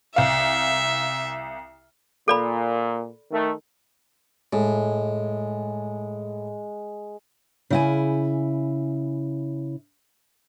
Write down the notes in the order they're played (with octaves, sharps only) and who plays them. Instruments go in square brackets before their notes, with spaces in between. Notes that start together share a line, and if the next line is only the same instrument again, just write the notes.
[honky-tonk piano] C2 F5 [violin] E5
[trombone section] A#2 [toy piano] A4 D5 B5
[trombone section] D#3 A3
[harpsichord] A2 [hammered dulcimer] G#3
[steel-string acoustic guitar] C#3 E4 G#5